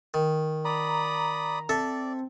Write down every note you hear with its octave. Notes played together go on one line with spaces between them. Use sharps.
D#3
D5 A#5 B5 D#6
C4 A4 D5 E5